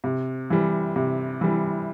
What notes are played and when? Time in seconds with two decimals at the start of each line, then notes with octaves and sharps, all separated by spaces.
0.04 C3
0.50 E3 G3
0.96 C3
1.41 E3 G3